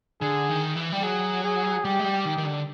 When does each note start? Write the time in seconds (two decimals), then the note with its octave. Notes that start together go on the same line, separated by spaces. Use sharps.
0.21 D3 G#4
0.49 D#3
0.75 E3
0.92 G3
1.02 F#3 G#4
1.44 G#4
1.84 G3 G4
1.99 G#3
2.04 G3
2.25 D#3
2.37 D#3
2.45 D3